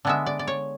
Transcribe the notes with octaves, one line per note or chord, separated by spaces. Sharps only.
D3 G#3 B3 E5
D5
D5
C#5